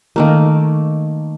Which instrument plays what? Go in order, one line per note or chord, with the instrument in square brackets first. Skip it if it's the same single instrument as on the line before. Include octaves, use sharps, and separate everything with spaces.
[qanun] D#3 A3 A#3